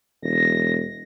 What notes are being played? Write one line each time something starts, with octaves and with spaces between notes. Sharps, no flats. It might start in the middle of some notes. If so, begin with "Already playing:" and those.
E1 A#6